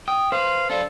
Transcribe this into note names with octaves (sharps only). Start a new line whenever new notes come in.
G5 D#6
B4 C5 F5
D4 A4 F5